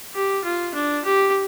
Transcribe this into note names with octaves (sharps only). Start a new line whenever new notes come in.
G4
F4
D4
G4